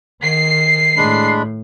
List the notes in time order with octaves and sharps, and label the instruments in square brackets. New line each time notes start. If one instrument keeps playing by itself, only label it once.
[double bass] D#3 [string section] C7
[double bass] A2 [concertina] G#3 D4 B5